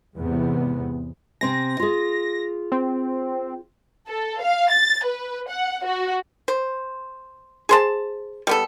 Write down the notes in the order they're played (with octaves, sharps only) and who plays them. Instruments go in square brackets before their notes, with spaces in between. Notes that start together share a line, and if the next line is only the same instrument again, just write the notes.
[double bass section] E2 G#2 C3 B3
[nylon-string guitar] C3 C4 G#5 [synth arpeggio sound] A#6
[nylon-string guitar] F4 G#4
[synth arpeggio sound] C4
[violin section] A4
F5
A6
B4
F#5
F#4
[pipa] C5
G#4 C5 A5
G3 B3 A4